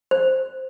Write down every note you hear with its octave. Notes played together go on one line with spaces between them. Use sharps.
C5